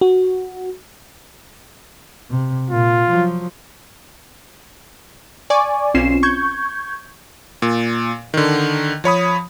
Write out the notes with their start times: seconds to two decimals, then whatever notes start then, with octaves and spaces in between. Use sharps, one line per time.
0.01 F#4
2.30 C3
2.70 A#2 F4
3.09 F3 F#3
5.50 D5 G#5 C#6 D6
5.94 B1 C4 C#4 F4 C7 E7
6.23 C#6 G6 G#6
7.62 A#2
8.34 D3 D#3
9.04 F3 C#5 B5 D#6